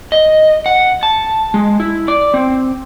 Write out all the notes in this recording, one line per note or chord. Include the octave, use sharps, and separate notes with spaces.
D#5
F#5
A5
G#3
E4
D5
C4